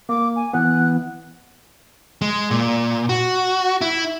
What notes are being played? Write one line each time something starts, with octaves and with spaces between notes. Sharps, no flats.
A#3 D6
G#5
E3 B3 F#6
G#3
A#2
F#4
E4